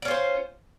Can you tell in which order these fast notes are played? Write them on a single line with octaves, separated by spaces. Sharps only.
D5 C#4 F4 C5